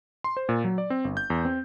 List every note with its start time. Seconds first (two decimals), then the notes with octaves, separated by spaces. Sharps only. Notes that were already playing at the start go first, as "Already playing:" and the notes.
0.24 C6
0.37 C5
0.49 A#2
0.64 F#3
0.78 D5
0.90 C4
1.05 G1
1.17 G6
1.30 E2
1.45 C4